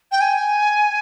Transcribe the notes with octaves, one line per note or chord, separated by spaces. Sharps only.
G5
G#5